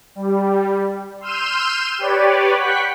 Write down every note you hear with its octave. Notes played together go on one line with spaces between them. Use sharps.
G3
C6 E6 F6 G6 D#7 E7
G4 B4 C#5 D5
F#5 G5 B5 C#6 F#6 B6